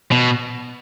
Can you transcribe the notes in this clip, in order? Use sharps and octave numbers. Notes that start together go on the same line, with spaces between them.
B2